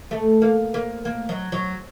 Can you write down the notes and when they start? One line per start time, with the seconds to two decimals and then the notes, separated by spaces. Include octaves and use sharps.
0.11 A3
0.42 A#3
0.74 A#3
1.05 A#3
1.29 F#3
1.52 F#3